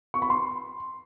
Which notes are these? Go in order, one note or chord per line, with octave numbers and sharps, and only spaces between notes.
C#6
B5
C6